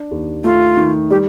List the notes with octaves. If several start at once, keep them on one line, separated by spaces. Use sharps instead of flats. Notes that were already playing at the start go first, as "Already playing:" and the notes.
Already playing: D4
D#2
A3 F4
D#3
G3 G4